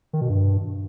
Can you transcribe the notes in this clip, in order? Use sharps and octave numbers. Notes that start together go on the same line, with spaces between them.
D#3
B2
G2